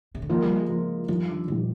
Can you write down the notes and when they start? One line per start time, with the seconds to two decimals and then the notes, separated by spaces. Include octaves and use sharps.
0.15 C3
0.22 D3
0.29 D#3 F3 A#3 F4 A#4
0.42 G3
0.56 G#3
0.69 F3 A#3 F4 A#4
1.08 F2 D#3 F3 G3
1.28 D3
1.48 F2 A#2 D#3 G3